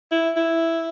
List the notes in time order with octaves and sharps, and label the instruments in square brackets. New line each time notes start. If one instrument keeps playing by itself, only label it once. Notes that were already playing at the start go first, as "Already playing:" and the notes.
[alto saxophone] E4
E4